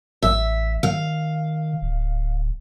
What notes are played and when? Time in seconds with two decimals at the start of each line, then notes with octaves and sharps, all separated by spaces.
0.22 A1 E5
0.83 D#3 F5
1.81 D1